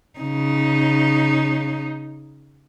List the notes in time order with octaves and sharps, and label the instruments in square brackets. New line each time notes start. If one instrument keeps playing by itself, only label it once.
[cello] C#3 D#4